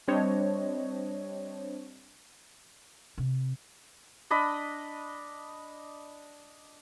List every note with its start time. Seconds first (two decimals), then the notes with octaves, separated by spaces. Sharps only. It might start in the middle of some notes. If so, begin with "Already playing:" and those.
0.08 G3 C4 D4 C5 C#5 D#5
3.18 C3
4.31 D4 D#5 B5